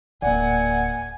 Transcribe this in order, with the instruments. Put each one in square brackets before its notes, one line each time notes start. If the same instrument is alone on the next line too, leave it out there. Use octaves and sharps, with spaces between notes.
[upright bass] D1 [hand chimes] A#3 D5 [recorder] F#5 [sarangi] G#5